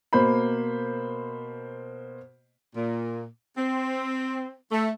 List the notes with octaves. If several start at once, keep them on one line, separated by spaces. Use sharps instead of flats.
B2 A#3 C5 B5
A#2
C4
A3